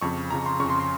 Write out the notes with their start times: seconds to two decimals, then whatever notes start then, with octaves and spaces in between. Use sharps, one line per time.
0.01 F2 C#3 C#6
0.31 F2 C#3 A#5
0.46 C6
0.60 F2 C#3 C#6
0.70 C6
0.80 C6